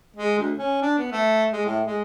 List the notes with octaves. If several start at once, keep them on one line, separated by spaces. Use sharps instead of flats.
G#3
D2
C#4
D4
B3
A3
G#3
A2
G#3